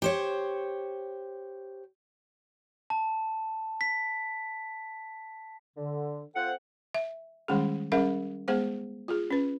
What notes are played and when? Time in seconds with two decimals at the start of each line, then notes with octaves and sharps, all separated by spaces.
0.02 G4 C5 C#5
2.90 A5
3.81 B6
5.77 D3
6.35 C4 F4 A4 C5 F#5
6.94 E5
7.48 D#3 G3 G#3 C#4 G#4
7.92 G3 C#4 G#4 A#4 E5 F5
8.48 G#3 B3 G#4 C5 F5
9.08 F4 G#4
9.30 C#4 B4